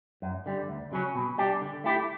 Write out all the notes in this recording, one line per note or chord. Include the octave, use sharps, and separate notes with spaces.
F#2
D3 G3
D2
C#3 F#3 C#4
B2
G3 D4 G4
D3
A3 E4 G4